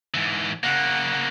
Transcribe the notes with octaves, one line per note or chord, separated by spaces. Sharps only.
G#2 E3
C#3 A#3 F#5